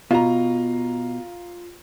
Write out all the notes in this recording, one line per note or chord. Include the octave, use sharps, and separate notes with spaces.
B2 F4 A#5